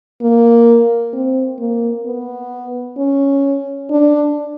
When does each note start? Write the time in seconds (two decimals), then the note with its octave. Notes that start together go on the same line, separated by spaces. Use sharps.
0.22 A#3
1.13 C4
1.60 A#3
2.06 B3
2.98 C#4
3.90 D4